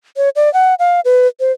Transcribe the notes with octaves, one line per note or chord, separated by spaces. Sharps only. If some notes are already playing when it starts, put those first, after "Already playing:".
C#5
D5
F#5
F5
B4
C5